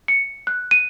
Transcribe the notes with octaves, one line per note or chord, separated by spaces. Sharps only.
C#7
F#6
D#7